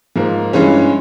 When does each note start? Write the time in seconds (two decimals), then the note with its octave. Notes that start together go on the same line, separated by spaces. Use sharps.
0.16 G#2 F3 A#3
0.53 G2 E3 G#3 C#4